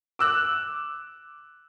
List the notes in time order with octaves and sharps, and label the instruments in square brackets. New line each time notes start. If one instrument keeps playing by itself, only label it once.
[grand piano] D6 E6 F#6